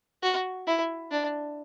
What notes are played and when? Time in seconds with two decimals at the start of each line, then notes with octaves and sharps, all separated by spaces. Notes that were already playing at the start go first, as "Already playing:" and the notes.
0.22 F#4
0.67 E4
1.11 D4